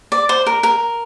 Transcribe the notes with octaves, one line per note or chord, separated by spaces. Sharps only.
D5
C5
A#4
A#4